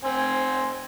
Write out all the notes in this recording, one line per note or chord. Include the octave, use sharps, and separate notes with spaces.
C4 G#5 C6